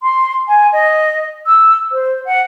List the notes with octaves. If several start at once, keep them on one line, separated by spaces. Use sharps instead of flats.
C6
G#5
D#5
E6
C5
F#5